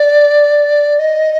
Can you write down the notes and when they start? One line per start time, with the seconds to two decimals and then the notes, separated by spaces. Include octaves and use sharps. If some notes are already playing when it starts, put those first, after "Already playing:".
Already playing: D5
0.99 D#5